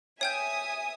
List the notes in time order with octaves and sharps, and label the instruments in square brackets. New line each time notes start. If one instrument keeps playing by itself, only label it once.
[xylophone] C#5 G5 G6 [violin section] E5 G#5 D#6